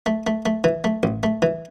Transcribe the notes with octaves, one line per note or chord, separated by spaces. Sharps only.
A3
A3
A3
E3
A3
A1
A3
E3